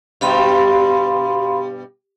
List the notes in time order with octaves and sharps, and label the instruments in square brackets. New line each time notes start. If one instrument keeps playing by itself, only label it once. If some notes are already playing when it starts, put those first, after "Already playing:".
[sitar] G2 B2 G3 [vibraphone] F5 B5 C6